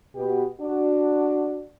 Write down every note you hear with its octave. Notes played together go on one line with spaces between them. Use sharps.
B2 B3 F#4 G4
D4 F#4